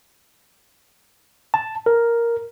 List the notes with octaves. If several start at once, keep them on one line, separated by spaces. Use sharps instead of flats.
A5
A#4